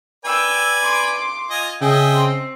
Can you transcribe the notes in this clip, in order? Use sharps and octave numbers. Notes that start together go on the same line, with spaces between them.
B4 D5 G5 G#5 E6
C6 D6
F4 D#5 G#5
C#3 G#4 D#5 E5 G5 G#5
C4